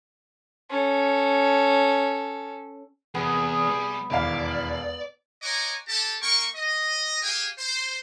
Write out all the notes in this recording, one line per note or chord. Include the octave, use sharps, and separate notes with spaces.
C#4 A4
E2 C3 B3 G#4
G3
E1 D#2 E4 D5 F5
C#5 D#5 F#5 G#5 A#5 D6
G4 A4 A5
A#3 A#4 G5 C#6
D#5
G4 G#4 F5 G5 G#5
C5